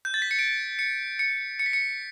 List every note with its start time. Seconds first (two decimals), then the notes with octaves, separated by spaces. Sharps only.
0.05 G6
0.14 A6
0.22 B6
0.31 C#7
0.39 D7
0.79 C#7
1.19 C#7
1.59 C#7
1.66 B6
1.73 C#7